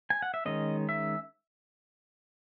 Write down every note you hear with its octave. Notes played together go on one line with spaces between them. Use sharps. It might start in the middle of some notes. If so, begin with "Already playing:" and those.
G#5
F#5
E5
D#3 G#3 C#4 D#5
E5